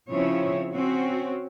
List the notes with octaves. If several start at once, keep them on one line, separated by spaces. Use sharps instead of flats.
C#3 F3 C4 E4 C#5
C4 C#4 F#4